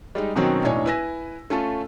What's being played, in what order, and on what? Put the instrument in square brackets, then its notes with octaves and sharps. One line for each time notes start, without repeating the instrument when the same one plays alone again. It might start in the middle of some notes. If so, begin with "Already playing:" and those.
[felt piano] G3 G#3 D#4
B2 D#3 F#3 C4 C#4
E1 A2 D4 D#4 C#5 G#5
E4 B4 G#5 E6 A#6
A3 C#4 F4 A4